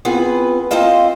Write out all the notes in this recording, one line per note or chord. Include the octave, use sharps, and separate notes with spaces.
B3 C4 F4 G#4 B4
C4 F4 A4 C5 D#5 F5